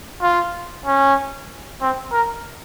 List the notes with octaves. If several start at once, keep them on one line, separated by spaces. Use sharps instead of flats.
F4
C#4
C4
A#4